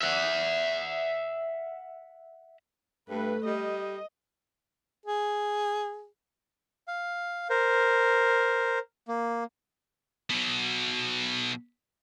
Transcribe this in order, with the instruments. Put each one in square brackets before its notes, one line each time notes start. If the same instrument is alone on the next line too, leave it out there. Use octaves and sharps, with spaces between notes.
[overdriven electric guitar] E5 F#5
[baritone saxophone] G2 [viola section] A3 B4
[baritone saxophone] G3 [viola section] D#5
[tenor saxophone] G#4
[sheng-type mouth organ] F5
A#4 C5
A#3
[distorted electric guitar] B2 F#3